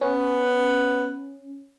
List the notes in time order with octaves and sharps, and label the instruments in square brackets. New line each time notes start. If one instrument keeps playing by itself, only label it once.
[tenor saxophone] B3 [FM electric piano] C#4